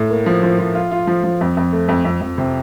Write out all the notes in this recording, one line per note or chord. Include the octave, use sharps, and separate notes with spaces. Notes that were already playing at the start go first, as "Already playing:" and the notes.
Already playing: A2
A#3
F3
F3
F3
F4
F4
F3
F3
F2
F2
A3
F2
F2
F2
C3